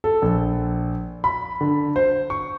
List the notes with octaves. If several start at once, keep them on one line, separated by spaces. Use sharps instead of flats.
A4
A#1
B5
D3
C5
C#6